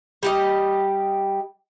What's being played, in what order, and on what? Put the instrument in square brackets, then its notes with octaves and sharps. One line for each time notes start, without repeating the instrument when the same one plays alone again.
[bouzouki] G3 G4 D#5